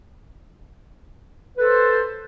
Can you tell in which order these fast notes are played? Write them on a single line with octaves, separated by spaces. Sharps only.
B4 A4 C5